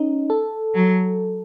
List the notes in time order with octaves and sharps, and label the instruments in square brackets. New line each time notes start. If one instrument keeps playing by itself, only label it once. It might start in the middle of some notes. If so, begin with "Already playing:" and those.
Already playing: [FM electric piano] C#4 D#4
A4
[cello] F#3